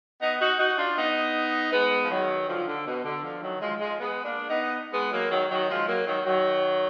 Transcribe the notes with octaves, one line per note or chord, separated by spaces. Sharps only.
B3 D#4
D#4 F#4
D#4 F#4
D4 F4
B3 D#4
G#3 B3
F3
D#3 F#3
D3 F3
D3
B2
D3
D3 F3
D#3 F#3
F3 G#3
F3 G#3
G#3 B3
A#3 D4
B3 D#4
G#3 B3
F#3 A#3
D#3 F#3
D#3 F#3
F3 G#3
F#3 A#3
D#3 F#3
D#3 F#3